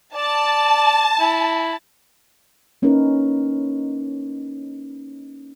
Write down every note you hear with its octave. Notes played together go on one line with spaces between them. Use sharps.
D5 A5
E4
A#3 C#4 D#4 E4 A#4 B4